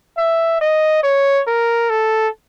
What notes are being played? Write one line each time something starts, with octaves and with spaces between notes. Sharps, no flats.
E5
D#5
C#5
A#4
A4